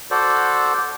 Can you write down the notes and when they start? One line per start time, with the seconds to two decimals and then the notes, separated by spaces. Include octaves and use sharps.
0.11 F#4 A4 C5 D5